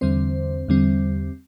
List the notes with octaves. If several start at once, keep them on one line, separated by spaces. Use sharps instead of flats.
E2 D3 G3 C4 C5
E2 D3 G3 C4